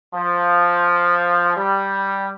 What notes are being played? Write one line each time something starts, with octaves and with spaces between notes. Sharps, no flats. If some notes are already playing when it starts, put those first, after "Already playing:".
F3
G3